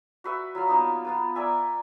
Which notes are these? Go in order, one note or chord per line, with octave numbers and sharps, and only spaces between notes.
F#4 B4 E5
F#3 F4 F5
A#3 B3 D#4
B3 F4 B4
A#4 D5 E5 G#5